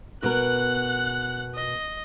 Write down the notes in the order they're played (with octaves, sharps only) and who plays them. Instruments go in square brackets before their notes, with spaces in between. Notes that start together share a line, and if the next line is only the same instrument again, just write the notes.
[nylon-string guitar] B2 A#4 [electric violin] F#5 F#6
[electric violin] D#5